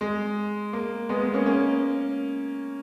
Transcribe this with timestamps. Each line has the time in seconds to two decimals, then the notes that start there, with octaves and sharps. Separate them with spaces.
0.01 G#3
0.73 A#3
1.09 G#3 B3
1.21 G#3 B3
1.34 A#3 C#4
1.46 A#3 C#4